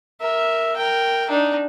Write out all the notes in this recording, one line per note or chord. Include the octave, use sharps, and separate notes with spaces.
A#4 E5
A#4 G5
D4 D#4